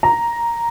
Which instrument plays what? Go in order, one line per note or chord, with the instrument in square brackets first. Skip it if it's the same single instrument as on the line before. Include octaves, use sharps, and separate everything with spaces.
[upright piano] A#5